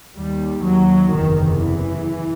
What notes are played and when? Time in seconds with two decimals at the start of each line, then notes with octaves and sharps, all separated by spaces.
0.16 D#2 G3
0.65 F#3
1.12 F#1 E2 C3 D#3
1.60 E3